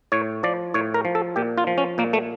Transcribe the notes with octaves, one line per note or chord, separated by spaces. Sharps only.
A2 C#5
F3 D5
A2 C#5
A#4
F3
A4
A#2 G4
F4
F3
C#4
A#2 A#3
A3